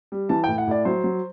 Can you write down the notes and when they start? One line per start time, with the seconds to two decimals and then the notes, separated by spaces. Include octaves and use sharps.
0.12 G3
0.29 E3 A5
0.44 A2 G5
0.58 F#5
0.67 A2 D5
0.85 F#3 C5
1.04 F#3